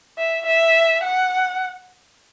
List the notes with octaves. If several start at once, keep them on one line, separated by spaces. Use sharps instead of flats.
E5
E5
F#5